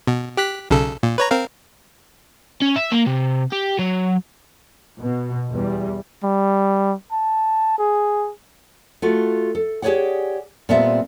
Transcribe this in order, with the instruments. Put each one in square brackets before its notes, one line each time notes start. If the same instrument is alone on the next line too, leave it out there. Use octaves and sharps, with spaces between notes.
[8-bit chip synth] B2
G4 F#6 B6
B1 C#3 A4
A#2
B4 C#5 A#5
C4 A#4 F5
[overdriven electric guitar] C#4
E5
A#3
C3
G4
F#3
[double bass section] B2
E2 G3
[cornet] G3
A5
G#4
[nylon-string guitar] A3 F4 F#4
A4
G4 G#4 B4 C#5 D5 F#5
A#2 G3 B3 C4 E5 A5